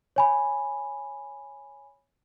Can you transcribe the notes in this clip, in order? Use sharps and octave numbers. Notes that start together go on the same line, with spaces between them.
C#5 G#5 B5